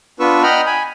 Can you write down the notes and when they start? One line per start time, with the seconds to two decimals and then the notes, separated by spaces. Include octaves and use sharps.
0.20 B3 D4 F4 B4 C#6 E6
0.43 D#5 F#5 G5 A#5 B5 F6
0.66 G#5 B5